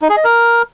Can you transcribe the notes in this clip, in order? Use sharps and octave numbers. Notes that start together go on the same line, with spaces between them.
D#4
G#4
D#5
A#4